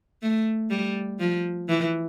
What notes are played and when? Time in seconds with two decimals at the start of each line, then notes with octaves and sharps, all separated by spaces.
0.22 A3
0.70 G3
1.19 F3
1.69 E3